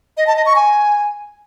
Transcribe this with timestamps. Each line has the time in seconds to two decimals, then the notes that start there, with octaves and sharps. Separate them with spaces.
0.17 D#5
0.27 A5
0.36 D#5
0.46 C#6
0.56 G#5